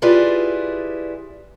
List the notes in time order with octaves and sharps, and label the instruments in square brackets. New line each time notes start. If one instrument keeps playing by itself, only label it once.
[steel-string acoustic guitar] E4 F4 G4 G#4 B4 D5